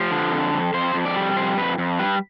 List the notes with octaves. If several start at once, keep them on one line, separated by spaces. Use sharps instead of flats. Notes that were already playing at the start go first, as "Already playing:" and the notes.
Already playing: F3 G4
D3
F2
F2
F2 C5
F2
D5
G3
F2 C5
F2 B4
F2
G3 B4